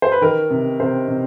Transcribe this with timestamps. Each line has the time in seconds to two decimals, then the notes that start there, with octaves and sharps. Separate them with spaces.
0.02 C5
0.12 B4
0.21 D#3 A#4
0.50 C3
0.80 C3 C5
1.08 C3